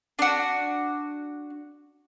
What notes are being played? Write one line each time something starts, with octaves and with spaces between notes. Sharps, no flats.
D4 F#4